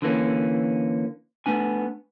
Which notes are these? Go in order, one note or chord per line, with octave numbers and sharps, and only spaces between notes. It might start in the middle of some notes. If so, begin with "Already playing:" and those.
D3 E3 A#3 C#4
A3 B3 D4 G#5